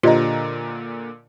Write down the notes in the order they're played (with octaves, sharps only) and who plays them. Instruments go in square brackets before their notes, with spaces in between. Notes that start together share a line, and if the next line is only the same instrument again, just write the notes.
[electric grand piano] A#2 D3 A#5 [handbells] F4 G4 [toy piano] C5 D5 D#5